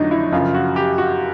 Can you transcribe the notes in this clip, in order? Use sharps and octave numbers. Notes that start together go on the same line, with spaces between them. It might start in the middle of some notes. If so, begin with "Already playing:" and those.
Already playing: F2 D3 F#3 A3 D4 D#4
E4
F#2 C#3 F3 F4
F4
F#4
G4
F#4